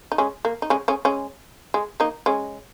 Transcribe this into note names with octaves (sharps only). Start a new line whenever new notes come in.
D#4
G#3 C#4
A#3
D#4
G#3 C#4
G#3 C#4
G#3 C#4
G#3
A#3 D#4
G#3 C#4